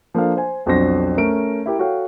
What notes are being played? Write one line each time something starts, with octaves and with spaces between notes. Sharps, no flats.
F3 A#3 D4 A4 F5
C5 G#5
B1 F2 D4 F#4 C5 A#6
A3 C#4 A#4 D7
E4 G4 A#4
F#4 A4 C#5 F5 G5